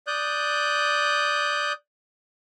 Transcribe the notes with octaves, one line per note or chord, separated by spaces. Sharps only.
D5 D#6 F#6 G6